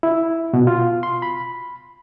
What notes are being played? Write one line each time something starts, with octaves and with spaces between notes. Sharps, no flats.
E4
B2
F4
C6
B5